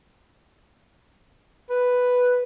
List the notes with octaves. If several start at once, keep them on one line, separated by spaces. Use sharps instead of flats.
B4